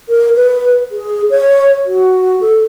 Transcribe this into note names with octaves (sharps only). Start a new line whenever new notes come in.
A#4
B4
G#4
C#5
F#4
A4